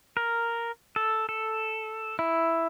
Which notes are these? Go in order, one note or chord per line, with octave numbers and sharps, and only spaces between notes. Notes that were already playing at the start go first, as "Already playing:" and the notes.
A#4
A4
A4
E4